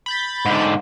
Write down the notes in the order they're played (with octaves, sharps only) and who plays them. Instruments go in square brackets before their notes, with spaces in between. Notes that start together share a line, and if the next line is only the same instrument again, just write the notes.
[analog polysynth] B5 G6 A6
[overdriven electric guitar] G#2 D3